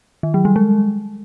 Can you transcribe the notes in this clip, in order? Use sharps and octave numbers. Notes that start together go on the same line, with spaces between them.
D#3
F#3
G3
G#3